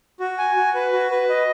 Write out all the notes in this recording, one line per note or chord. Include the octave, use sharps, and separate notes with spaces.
F#4
G#5
F#4
B4
F#4
B4
D#5